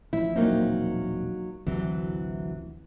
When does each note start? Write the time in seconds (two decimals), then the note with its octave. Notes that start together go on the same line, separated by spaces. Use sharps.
0.13 A1 F3 E4
0.36 E1 A#1 F#3 A#3 C4 D#4
1.67 A1 D2 C3 E3 F#3